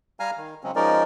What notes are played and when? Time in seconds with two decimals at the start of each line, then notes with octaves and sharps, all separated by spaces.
0.20 G3 F5 G#5 A#5 F6
0.37 D#3
0.64 C#3 F#3 G#3 C4 C#4
0.76 F3 G#3 C#4 D#4 A#4 D5